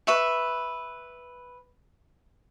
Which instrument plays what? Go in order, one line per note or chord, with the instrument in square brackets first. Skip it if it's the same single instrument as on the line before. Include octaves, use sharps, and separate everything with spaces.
[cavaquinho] B4 E5 C#6